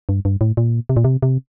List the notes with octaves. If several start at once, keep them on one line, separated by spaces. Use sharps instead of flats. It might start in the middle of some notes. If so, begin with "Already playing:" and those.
G2
G2
A2
A#2
C3
A#2
C3
C3